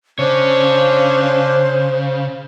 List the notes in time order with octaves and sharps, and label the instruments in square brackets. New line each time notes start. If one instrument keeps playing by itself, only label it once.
[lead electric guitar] C#3 [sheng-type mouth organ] C#4 D4 [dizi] C5 [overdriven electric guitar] C#5